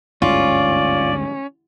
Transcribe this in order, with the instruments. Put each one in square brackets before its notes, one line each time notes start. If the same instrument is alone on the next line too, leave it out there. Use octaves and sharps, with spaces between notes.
[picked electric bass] G1 D2 G#2 [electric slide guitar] C#4 [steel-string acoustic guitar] F4 [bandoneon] D5